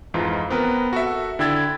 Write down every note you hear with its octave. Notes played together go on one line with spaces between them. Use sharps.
F2 G#2 E3 D#4 F4
B3 C4 A#4 B4
F#4 A4 E5
D3 E4 G5 E6 G#6 A6